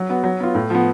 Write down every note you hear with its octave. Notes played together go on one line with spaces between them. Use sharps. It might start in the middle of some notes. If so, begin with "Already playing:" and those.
Already playing: F#3
B3 F#4
F#3
B3 F4
A2
F3 B3